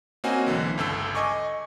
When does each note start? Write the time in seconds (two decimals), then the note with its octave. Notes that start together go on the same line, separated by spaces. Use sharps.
0.24 A#3 C4 C#4 F#4 D#5 G#5
0.46 B1 D3 E3
0.78 G1 C#2 A4 E6
1.15 D#5 G#5 C#6 D6